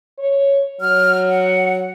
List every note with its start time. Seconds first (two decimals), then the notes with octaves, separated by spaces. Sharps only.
0.19 C#5
0.81 F#3 F6
1.29 F#5